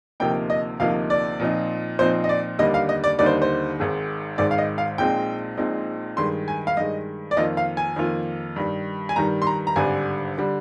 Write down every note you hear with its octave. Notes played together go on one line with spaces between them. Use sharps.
D2 C3 F3 A#3 D#4 G5
D#5
D2 C3 F3 A#3 D#4 F5
D5
A#2 F3 C4 D#4
A#2 F3 C4 D#4 C5
D#5
D5
D#2 D3 G3 A#3 D#4 D#5
F5
D#5
D5
D#2 D3 G3 A#3 D#4 D5
C5
C5
G#1 G#2 D#3 G#3
G#1 G#2 D#3 G#3 D5
F5
D#5
F5
A#1 A#2 G#3 C4 D#4 G5
A#1 A#2 G#3 C4 D#4
G2 D#3 G#3 C6
G#5
F5
G2 D#3 G#3 D#5
D5
F2 D#3 A#3 F4 D#5
F5
G#5
F2 D#3 A#3 F4
G2 D#3 G3
G#5
G2 D#3 G3 A#5
C6
A#5
A#5
G#1 G2 D3 G3 G#5
D3 G3